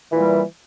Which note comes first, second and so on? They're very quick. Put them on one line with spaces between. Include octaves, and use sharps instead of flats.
E3 A#2 G3